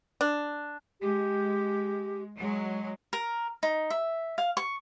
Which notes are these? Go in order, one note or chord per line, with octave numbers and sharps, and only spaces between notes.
D4
G#3 G4
F#3 G#3
A#4
D#4
E5
F5
C#6